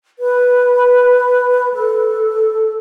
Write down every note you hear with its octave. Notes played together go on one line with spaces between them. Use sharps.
B4
A4